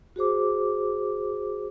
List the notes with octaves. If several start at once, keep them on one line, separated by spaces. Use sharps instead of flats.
F#4 G#4 C5 D6